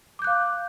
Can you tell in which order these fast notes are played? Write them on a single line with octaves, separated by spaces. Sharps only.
D6 G6 F#6 F5